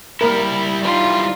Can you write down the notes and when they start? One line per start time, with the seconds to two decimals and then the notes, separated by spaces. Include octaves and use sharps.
0.21 G3 A#3 E4 A#4
0.83 E3 G3 D#4 F4